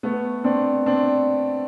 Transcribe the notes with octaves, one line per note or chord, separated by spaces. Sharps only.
A3 B3
C4 D4
C4 D4